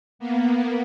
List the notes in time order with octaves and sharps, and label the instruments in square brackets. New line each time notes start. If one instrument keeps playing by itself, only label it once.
[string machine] A#3 B3